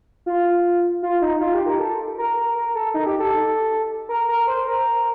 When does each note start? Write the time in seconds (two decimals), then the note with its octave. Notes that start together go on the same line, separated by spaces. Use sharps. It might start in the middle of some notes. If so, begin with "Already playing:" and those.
0.26 F4
1.03 F4
1.22 D#4
1.40 F4
1.54 G4
1.66 A#4
1.79 A4
2.18 A#4
2.37 A#4
2.55 A#4
2.75 A4
2.94 D#4
3.06 G4
3.19 A4
4.09 A#4
4.29 A#4
4.47 C5
4.67 A#4